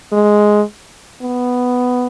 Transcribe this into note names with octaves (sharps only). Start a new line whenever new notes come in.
G#3
B3